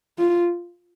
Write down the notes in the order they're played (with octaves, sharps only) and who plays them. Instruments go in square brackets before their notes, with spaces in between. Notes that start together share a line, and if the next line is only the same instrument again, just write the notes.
[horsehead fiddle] F4